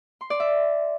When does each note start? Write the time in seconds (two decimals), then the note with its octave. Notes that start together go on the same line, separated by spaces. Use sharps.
0.21 C6
0.30 D5
0.40 E5